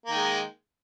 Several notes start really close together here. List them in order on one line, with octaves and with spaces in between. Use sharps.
A#3 D#3 G#3